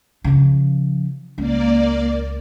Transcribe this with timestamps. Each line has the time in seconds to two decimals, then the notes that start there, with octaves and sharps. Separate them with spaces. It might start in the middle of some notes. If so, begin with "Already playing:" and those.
0.24 C#3 F3
1.38 C#2 A#3 D5